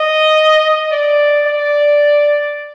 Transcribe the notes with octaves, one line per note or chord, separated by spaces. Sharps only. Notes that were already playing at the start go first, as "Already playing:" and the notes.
Already playing: D#5
D5
D5